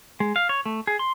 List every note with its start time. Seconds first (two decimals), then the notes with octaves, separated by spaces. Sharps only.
0.20 G#3
0.36 F5
0.49 C#5
0.66 A3
0.87 G#4
0.99 C6